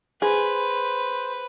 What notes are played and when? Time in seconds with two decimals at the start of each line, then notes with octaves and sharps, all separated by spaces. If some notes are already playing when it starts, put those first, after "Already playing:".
0.22 G#4 B4 C5